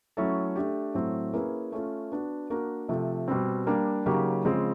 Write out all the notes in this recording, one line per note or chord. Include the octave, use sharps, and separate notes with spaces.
F#3 A3 C#4 E4 A4
A3 D4 G4
A2 F#3 A3 C4
A#3 C#4 E4 G#4 B4
A3 C#4 F4
B3 D4 F#4
A#3 D4 F#4 A#4
C3 F3 A3
B2 G3 C4
G3 A#3 D4
C#3 F#3 A#3 D#4 G4
C#3 F3 G#3 C4